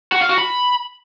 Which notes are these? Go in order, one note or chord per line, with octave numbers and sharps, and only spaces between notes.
F#4
F5
F#4
B5